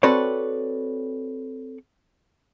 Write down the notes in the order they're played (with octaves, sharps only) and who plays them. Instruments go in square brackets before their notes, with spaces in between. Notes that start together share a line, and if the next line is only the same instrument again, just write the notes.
[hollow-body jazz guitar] C4 F#4 A4 B4 C#5 D5